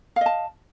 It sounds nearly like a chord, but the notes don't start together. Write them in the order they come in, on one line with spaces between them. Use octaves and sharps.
F5 D#5 A5